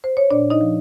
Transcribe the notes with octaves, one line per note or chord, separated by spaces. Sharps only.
C5
C#5
A#2 D4 D5
D#4 D#5
F3